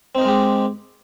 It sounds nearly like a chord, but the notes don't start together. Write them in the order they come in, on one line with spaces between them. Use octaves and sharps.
C4 D#4 A#4 G#3 G4